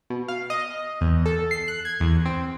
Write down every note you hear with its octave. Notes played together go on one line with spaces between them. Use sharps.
B2
F5
D#5
E2
A4
C7
F#6
G#6
E2
C4